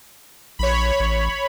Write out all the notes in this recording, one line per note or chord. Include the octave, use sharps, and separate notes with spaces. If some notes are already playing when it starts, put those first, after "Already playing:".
A#1 C#5 B5
A1